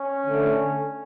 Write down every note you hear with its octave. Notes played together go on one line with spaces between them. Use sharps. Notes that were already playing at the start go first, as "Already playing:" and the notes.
Already playing: C#4
D3 A3